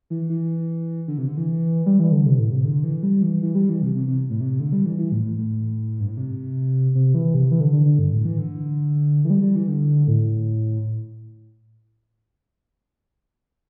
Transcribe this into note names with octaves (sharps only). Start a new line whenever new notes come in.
E3
E3
D3
C3
D3
E3
G3
E3
D3
C3
A2
C3
D3
E3
G3
E3
E3
G3
E3
C3
C3
C3
A2
C3
D3
G3
E3
E3
A2
A2
A2
G2
A2
C3
C3
E3
C3
E3
D3
D3
D3
G2
A2
E3
D3
E3
G3
G3
E3
D3
A2